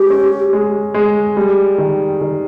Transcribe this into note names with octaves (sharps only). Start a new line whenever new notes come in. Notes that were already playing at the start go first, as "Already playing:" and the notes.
Already playing: G#3 G4
C#4
G#3
G#3
G3
D#3
D#3